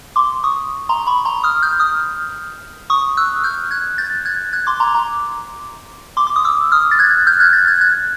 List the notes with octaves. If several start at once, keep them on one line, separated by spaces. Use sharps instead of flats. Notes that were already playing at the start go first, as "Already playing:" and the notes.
C6 D6
C#6 D#6
A#5 C6
B5 C#6
A#5 C6
D#6 F6
F6 G6
D#6 F6
C#6 D#6
E6 F#6
F6 G6
F#6 G#6
G6 A6
F#6 G#6
F#6 G#6
C6 D6
A#5 C6
A#5 C6
C6 D6
D6
D#6
D6 E6
D#6 F6
A6
F#6 G#6
F6 G6
F#6 G#6
G6 A6
F#6 G#6
F#6 G#6